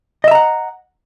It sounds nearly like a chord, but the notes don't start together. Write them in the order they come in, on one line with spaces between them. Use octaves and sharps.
D#5 E5 A#5 F#5